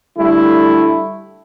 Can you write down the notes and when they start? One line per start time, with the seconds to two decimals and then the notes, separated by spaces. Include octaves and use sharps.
0.16 D3 G3 A3 E4